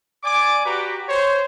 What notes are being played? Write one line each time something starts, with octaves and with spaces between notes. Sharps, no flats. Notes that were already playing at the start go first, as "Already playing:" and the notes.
D5 G#5 D6
F#4 G4 B4 A#5
C5 C#5